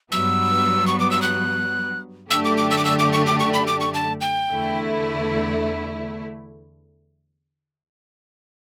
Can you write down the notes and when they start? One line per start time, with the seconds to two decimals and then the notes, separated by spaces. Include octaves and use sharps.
0.12 G2 F#3 B3 E6
0.87 C#6
1.00 D6
1.11 E6
1.22 F#6
2.31 F#2 D3 A3 D4 G4 E6
2.45 D6
2.57 D6
2.71 E6
2.78 D6
2.85 E6
2.99 D6
3.13 C#6
3.26 D6
3.40 C#6
3.54 B5
3.67 D6
3.80 C#6
3.94 A5
4.21 G5
4.49 E2 D3 A3 E4